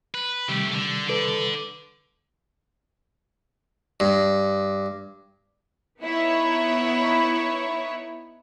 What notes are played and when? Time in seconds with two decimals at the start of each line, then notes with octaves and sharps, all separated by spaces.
0.14 B4
0.48 C3 D#3 G3 A3 G4
0.75 D3
1.09 D3 A4 B4 D5
4.00 G2
6.00 B3 D#4 E4 C#5